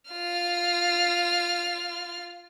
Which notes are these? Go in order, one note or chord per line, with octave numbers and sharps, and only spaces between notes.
F4 F6